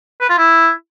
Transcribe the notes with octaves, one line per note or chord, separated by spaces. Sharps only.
B4
F4
E4